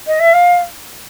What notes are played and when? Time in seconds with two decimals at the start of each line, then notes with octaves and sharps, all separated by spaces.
0.07 D#5
0.19 E5
0.33 F5